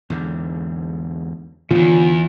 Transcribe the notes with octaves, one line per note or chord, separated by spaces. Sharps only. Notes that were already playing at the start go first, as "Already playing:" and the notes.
E2 G#2 D3
E2 G#2 D3 D#3 B3 F4